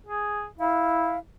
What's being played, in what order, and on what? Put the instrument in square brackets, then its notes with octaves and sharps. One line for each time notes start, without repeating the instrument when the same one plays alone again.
[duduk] G#4
[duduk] E4 [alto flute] F5